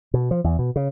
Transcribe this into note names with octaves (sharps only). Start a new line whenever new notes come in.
B2
F3
E2
B2
C#3